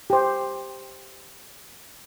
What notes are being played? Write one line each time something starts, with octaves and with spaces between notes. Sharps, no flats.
G4 C5